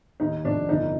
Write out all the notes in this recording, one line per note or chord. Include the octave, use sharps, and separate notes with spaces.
D#2 D#4
F1 D4
G1 D#4